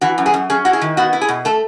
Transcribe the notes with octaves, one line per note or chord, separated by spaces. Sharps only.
E3 F#4
F#2
G#4
F#2
C#4 G#4
E4 F#4
G#4
D#3
B3 F#4
E4
G#4
B2
A3 A4